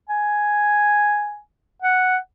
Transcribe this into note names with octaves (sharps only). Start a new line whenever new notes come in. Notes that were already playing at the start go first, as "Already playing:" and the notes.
G#5
F#5